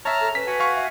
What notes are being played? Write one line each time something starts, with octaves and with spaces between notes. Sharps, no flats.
C#5 E5 A5 A#5 F6
A4
C#4 B4 B6
F#4 F#5 G#5
F5 C#6
E5